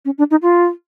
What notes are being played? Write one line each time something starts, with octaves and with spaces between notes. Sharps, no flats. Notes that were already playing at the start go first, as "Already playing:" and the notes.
C#4
D4
D#4
F4